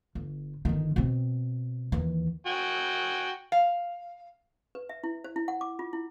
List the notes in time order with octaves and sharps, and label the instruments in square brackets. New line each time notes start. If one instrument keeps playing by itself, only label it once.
[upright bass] G1
G1 D#3
B2 C4
D#2 E3
[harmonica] F#4 G5 G#5
[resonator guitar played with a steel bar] F5
[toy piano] B4
E5
E4
C5
E4
F#5
D6
F4
E4